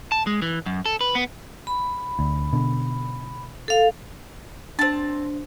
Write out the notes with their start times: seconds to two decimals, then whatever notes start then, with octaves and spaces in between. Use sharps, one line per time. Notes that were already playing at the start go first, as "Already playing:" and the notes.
0.12 A5
0.27 G#3
0.42 E3
0.66 F#2
0.86 A4
1.01 B4
1.15 B3
1.67 B5
2.19 D2
2.53 B2 D3
3.68 A4 F5
4.79 C4 D4 C5 A5